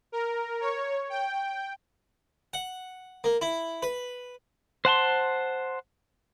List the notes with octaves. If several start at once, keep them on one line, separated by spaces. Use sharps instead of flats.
A#4
C#5
G5
F#5
A#3
E4
B4
C5 F#5 A5 C6